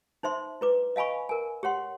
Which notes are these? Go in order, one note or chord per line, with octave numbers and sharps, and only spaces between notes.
D#4 C5 E5 C6
E4 B4 D6
D#5 F5 G#5 B5 C#6
A#4 G#5
G4 C#5 F#5 C6